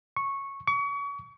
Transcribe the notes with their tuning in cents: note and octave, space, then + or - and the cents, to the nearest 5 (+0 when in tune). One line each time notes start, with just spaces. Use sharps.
C#6 -10
C#6 +35